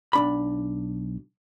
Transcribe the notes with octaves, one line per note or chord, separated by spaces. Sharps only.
B1 D4 B5